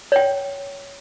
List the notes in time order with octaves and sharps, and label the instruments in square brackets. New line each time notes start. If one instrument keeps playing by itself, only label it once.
[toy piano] C#5 G5